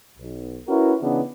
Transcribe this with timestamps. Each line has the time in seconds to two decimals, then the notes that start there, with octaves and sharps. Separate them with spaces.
0.18 B1
0.68 C#4 E4 F#4 A#4 B4
1.02 C#3 E3 B3 D4 D#4